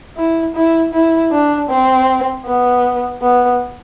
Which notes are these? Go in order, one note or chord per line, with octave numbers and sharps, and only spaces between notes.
E4
E4
E4
D4
C4
B3
B3